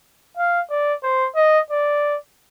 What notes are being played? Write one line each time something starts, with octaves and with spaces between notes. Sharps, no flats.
F5
D5
C5
D#5
D5